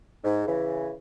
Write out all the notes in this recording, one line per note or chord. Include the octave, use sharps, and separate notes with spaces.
G#2
C#3 E3